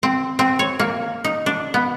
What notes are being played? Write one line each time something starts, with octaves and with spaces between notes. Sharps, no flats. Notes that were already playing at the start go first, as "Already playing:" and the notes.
C4
C4
C#5
A#3
D#4
D4
B3